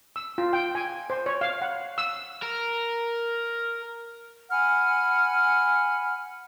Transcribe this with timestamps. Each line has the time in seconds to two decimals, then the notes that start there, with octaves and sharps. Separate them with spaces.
0.16 E6
0.38 F4
0.53 G5
0.75 G#5
1.10 C5
1.26 C#5
1.41 F5
1.62 F#5
1.98 E6
2.42 A#4
4.50 F#5 G#5 B5 F6